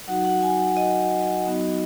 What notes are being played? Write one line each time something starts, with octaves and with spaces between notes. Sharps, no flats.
F#3 D#4 F#4 F#5
F#5
G#5
F#5
D#5
F#3 B3 D#4 F#4